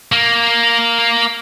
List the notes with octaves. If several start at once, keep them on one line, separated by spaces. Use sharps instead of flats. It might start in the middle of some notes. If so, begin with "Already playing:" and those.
A#3